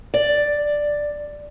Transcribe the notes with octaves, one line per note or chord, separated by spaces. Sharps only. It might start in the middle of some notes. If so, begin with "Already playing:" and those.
D5